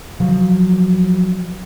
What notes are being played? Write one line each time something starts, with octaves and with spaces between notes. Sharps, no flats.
F3 F#3